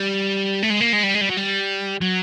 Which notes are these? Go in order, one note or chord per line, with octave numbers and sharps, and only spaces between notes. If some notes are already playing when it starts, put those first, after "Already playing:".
Already playing: G3
A3
G#3
A#3
G#3
G3
G#3
G3
F#3
G3
F#3